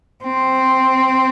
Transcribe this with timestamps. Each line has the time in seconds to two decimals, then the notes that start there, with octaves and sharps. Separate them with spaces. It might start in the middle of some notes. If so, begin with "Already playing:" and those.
0.23 C4